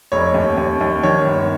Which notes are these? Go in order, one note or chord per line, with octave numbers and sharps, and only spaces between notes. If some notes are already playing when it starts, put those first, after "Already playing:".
F1 C#5
D#2
D#2
D#2
D#3 C#5
G1